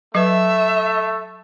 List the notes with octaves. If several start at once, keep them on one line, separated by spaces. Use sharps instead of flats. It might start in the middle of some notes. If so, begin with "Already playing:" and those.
F#3 A3 B4 E5